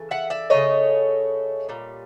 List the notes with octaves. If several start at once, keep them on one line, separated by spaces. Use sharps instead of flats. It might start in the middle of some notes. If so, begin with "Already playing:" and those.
Already playing: C#3 E3 A3
E5 F#5
D5 E5
C#3 F#3 A3 C#5 D#5
A#2 G3